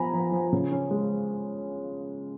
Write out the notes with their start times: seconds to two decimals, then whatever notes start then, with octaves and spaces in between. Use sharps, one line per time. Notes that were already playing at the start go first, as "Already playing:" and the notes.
Already playing: F3 B3 G#5 A#5 B5
0.13 F3
0.32 F3
0.53 C#3
0.71 C#4
0.91 G#3